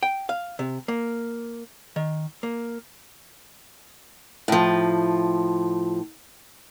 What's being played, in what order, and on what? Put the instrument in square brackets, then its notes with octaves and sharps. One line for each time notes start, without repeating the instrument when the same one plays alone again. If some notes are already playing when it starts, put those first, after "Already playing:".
[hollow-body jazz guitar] G5
F5
C3
A#3
D#3
A#3
[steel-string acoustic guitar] A2 F3